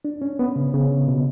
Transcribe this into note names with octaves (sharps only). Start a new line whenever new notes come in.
D4
C#4
B3
C#3
C#3
B2